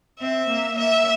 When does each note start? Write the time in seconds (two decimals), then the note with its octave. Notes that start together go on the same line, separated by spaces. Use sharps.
0.20 C4 E5
0.49 A#3
0.78 A#3 E5